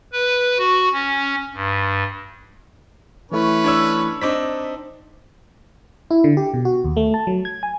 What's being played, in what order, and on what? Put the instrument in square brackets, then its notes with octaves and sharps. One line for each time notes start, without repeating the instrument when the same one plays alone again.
[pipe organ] B4
F#4
C#4
G2
[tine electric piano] E3 A3 E4 [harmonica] C#4 B4
[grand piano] D4 C#5 E6
[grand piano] C4 D4 D#4 [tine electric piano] D6 B6
[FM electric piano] E4
D3
G4
B2
F#4
D#2
A3
A5
F#3
G#6
G#5